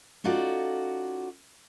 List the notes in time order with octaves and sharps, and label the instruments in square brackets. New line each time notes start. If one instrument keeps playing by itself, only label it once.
[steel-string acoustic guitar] C#4 D#4 F4 F#4 A4 D5